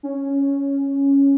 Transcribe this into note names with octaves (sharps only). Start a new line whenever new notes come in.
C#4